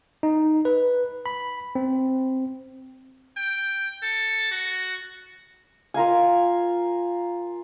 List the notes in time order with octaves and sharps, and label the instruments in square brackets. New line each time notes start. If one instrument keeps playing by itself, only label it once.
[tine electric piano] D#4
B4
B5
C4
[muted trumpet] G5
A4
F#4
[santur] F4 A#4 F5 G#5